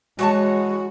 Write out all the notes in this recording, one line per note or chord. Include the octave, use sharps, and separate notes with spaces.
E3 G#3 F#4 C#5 A5